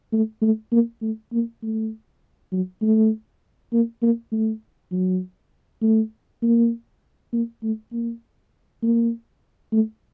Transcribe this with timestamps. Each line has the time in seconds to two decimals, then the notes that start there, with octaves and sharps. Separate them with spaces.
0.13 A3
0.42 A3
0.72 A#3
1.02 A3
1.32 A#3
1.62 A3
2.52 F#3
2.82 A3
3.73 A#3
4.02 A#3
4.32 A3
4.92 F#3
5.82 A3
6.42 A#3
7.33 A#3
7.63 A3
7.92 A#3
8.83 A#3
9.72 A3